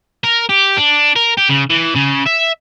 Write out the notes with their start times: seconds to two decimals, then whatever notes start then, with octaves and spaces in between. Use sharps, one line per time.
0.24 A#4
0.49 G4
0.78 D4
1.16 A#4
1.37 G4
1.49 C#3
1.70 E3
1.95 C#3
2.26 E5